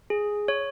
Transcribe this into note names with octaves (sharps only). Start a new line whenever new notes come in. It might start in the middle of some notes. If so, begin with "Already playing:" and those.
G#4
C#5